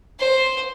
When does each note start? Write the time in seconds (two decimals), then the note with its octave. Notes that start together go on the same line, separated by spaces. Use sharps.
0.19 C5